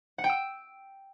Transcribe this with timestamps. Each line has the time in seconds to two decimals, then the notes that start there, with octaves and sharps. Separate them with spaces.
0.18 F#5
0.24 G5
0.29 E6